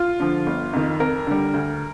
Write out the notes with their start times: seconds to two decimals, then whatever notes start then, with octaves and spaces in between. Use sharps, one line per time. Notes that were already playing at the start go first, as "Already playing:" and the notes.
Already playing: F4
0.20 D3 F3
0.46 G1
0.73 F2 D#3
1.00 F2 A#4
1.27 D3 G3
1.54 D2